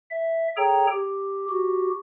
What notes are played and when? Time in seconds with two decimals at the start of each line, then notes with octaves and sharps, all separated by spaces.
0.11 E5
0.57 G#4 A4 C#5 G5 A#5
0.92 G4
1.49 F#4 G4